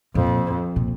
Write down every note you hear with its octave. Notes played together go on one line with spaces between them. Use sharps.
F2 A#2
A#2